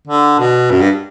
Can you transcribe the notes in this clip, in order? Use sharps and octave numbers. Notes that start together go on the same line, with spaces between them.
D3
B2
F#2
G2